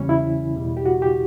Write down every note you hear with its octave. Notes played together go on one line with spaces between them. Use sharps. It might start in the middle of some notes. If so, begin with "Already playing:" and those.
Already playing: E2 C#3 E3 G3 C#4
E4
E2 B2 G3
G4
F#4
G4